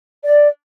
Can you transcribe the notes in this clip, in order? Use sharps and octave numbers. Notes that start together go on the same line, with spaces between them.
D5